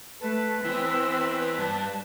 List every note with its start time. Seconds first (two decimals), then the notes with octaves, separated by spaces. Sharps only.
0.21 A3 B4 A5
0.65 E3 B3 C4 E6
1.58 G2 A5